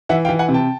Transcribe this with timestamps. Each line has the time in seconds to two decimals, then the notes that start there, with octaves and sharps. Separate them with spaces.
0.09 E3 E5 F#5
0.25 F5 G5
0.29 E3
0.39 F#5 G#5
0.48 C3
0.54 G5 A5